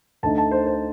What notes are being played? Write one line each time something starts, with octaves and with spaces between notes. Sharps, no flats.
D2 D3 A3 D#4 A5
A5
C5
C5